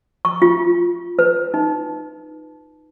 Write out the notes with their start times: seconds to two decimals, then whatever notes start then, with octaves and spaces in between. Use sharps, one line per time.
0.25 C#6
0.42 F4
1.19 B4
1.54 D#4